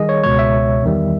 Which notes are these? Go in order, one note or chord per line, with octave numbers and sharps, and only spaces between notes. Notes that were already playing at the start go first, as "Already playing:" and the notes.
Already playing: D#3 G3 G#4 D#5
C#5
C#2 B2 G#3 C#5
E5
E2 D#3 G3